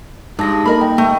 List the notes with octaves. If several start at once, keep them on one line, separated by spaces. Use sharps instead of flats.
G2 G#3 D#4 A5 A#6
A#3 A4 A#4 D#5 B5
G5
A3